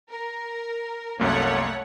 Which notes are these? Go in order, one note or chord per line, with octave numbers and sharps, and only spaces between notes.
A#4
C2 F#2 A3 A#3 C#5 F#5